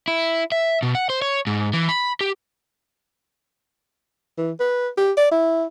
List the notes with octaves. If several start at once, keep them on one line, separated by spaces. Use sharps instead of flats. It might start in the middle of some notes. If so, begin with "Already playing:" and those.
E4
E5
B2
F#5
C5
C#5
G#2
E3
B5
G4
E3
B4
G4
D5
E4